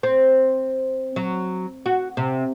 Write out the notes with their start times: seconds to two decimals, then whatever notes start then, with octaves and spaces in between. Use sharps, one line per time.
0.03 C4
1.16 F#3
1.86 F#4
2.17 C3